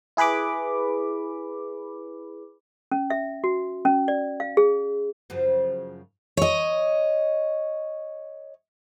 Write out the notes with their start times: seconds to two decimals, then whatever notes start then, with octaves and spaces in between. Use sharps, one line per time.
0.17 E4 G#4 B4 B5 D6
2.92 C#4
3.10 E5
3.44 F#4
3.85 C#4
4.08 D5
4.40 F5
4.57 G#4
5.30 F#2 C#3 F3
6.37 C#5 D#5